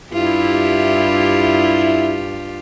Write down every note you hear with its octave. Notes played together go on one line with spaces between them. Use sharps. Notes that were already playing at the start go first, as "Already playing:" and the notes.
G2 E4 F4 G4